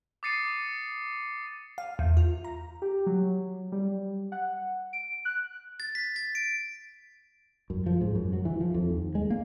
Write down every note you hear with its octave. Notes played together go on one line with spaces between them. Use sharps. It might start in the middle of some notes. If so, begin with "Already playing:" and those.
D6 D#6 A6 C7 C#7 D#7
F5
E2
F4
A#5
G4
F#3
G3
F#5
D7
F#6
A6
B6
A6
D7
F#2
F3
G#2
F#2
F#3
E3
F3
F2
D#2
G#3
A#3